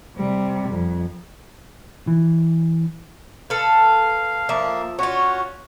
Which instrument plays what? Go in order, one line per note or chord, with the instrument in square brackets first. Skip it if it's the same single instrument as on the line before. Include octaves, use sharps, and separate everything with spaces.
[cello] C3 G3
F2
[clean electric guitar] E3
[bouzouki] A4 B4 [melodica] F5
[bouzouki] F3 E5 [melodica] A#3
[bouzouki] C#4 F4 [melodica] F#4 C#5